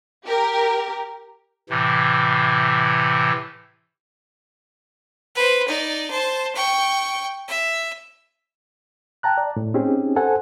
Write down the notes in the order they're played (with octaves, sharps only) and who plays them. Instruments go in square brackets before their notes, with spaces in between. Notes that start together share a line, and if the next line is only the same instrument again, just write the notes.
[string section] G4 A#4
[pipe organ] A2 C3 E3
[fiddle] B4 C5
D#4 D5
C5 A5
G5 C#6
E5
[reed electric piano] G5 A5 A#5 F#6
D5
A2
C4 C#4 D#4 G4 G#4
A4 C5 F#5 G#5